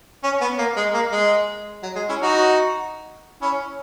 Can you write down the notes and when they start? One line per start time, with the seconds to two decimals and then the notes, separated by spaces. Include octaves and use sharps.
0.24 C#4
0.41 B3
0.59 A#3
0.77 G#3
0.94 A#3
1.12 G#3
1.83 F#3
1.95 G#3
2.09 C#4 E4
2.22 D#4 F#4
3.42 C#4 E4